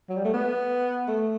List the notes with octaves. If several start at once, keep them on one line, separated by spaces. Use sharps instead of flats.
F#3
G3
A3
B3
A3